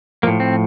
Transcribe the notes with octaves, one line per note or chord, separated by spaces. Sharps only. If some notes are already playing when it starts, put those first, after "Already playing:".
A2 F3 A#3
C4